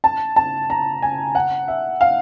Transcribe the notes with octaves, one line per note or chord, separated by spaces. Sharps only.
A5
A5
A#5
G#5
F#5
E5
F5